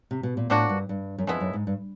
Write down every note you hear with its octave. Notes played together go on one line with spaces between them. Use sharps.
C3
B2
A#2
A2 F3 A#3 D4 F#4
G2
G2
F#2
F2 F3 G#3 B3 E4
F#2
G#2
G2